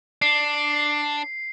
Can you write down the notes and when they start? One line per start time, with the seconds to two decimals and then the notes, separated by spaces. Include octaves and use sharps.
0.22 D4 C7